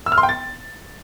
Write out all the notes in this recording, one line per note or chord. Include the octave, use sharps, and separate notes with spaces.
E6
F6
C6
G5
A6